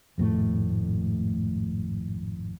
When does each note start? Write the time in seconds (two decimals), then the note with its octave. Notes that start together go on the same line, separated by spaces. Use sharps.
0.18 G#1 F2 A2 A3